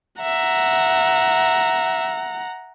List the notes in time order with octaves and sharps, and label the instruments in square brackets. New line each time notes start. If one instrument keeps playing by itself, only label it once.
[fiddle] E5 [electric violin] F#5 A#5